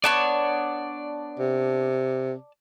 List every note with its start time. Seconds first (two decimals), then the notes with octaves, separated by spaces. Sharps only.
0.04 B3 D4 C#5 D5 A5
1.40 C3